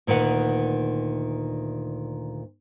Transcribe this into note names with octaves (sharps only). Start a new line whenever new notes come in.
D2 A#2 D#3 B4 F#5